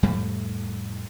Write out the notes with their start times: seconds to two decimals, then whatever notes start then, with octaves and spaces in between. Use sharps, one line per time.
0.03 F2 A2 G3 A3